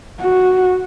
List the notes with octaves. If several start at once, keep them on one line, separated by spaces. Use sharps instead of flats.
F#4